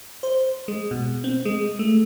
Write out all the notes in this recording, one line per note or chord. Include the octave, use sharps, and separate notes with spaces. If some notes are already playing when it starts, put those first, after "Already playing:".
C5
G#3
B2
C4
G#3
A3